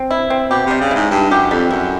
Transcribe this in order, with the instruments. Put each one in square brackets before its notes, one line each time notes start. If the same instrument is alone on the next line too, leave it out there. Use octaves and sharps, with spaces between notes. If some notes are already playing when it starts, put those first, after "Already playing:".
Already playing: [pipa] C4
E4
C4
[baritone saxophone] B2 [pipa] G4
[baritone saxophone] C3 [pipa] G3
[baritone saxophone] C#3
[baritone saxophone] G#2 [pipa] E4
[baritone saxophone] G2 [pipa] E4
[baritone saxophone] F#2 [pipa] G4
[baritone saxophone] F2 [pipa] G3
[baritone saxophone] F#2 [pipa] E4